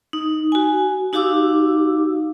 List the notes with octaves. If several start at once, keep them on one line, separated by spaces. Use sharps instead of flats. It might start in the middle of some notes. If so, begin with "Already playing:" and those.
D#4
F#4 G#5
D#4 F#4 G4 F5 D6 E6